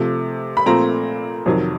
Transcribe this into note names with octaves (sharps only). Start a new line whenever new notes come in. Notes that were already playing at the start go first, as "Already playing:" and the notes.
Already playing: C3 F3 A3
B5
A#2 F3 A3 C4 A#5
F2 C3 D#3 F#3